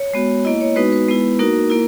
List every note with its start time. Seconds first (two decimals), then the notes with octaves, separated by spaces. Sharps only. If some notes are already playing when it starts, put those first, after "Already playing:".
Already playing: C#5
0.14 G#3 B3 F#4
0.45 A#3 E4 D#5
0.61 C#5
0.76 G#3 B3 D#4 F#4 B4
0.92 B4
1.08 G#3 B3 E4
1.39 A#3 D#4 F#4 A#4
1.70 A#3 E4 A#4